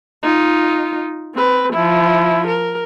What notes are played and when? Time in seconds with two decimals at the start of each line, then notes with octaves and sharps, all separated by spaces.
0.23 D#4 F4
1.35 C4 B4
1.73 F3 E4
2.47 A#4